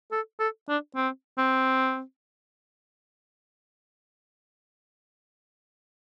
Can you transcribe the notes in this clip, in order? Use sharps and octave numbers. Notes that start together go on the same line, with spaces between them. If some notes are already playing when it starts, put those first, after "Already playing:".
A4
A4
D4
C4
C4